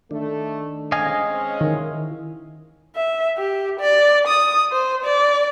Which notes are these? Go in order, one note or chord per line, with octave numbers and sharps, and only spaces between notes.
D#3 A3 D4
G#3 C4 C#4 D#5 F5 G#5
D#3 E4
E5
G4
D5
D#6
C5
D5